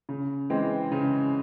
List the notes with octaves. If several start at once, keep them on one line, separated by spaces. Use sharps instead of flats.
C#3
E3 G#3 C4
C#3